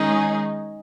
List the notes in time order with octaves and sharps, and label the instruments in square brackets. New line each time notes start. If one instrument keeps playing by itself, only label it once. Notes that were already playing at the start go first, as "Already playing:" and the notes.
Already playing: [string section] D#3 G#3 C#4 G#4 [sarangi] D#4